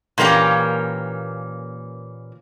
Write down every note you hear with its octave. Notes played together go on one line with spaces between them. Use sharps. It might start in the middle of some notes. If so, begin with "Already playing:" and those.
A#2 E3 A#3 C#4 G4